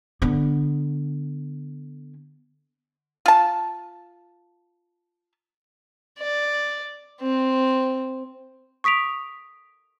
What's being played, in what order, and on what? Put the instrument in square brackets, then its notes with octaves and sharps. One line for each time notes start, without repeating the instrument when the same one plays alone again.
[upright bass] D3 B3
[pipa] F4 A5
[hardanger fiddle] D5
C4
[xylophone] C#6 D#6 B6 D7 F7